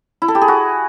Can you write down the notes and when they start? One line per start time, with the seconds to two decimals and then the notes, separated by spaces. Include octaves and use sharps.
0.22 E4
0.28 A4
0.35 G4
0.42 G#4
0.48 F#4